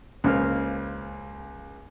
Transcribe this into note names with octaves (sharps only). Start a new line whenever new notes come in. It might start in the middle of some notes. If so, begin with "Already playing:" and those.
C#2 C#3 A#3 C5 F6